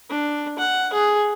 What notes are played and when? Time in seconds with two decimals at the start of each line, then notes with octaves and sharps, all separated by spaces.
0.10 D4
0.59 F#5
0.93 G#4